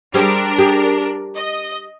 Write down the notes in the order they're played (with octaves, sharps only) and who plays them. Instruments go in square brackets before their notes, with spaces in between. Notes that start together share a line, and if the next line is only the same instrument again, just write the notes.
[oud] G3 G#4 C5 [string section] D4 A#4
[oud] G4 G#4
[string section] D#5